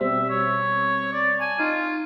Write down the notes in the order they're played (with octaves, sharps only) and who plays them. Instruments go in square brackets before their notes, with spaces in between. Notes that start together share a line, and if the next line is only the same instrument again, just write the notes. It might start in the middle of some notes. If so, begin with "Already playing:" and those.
[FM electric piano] B2 G3 C4 [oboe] E5
[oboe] C#5
D5
[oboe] G#5 [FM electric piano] A5
[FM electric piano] D#4 [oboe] F4